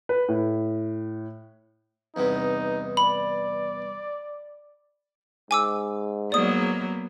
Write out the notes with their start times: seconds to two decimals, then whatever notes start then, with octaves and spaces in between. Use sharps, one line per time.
0.09 B4
0.29 A2
2.16 E2 G2 C3 D#4
2.97 D5 B5
5.51 G#2 G#5 D6 E6
6.32 F#3 A#3 B3 D5 D#6